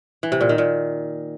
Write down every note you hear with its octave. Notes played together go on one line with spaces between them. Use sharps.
E3
C3
A#2
D#3
A#2